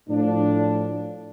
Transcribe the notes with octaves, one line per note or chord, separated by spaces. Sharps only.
A2 F3 D4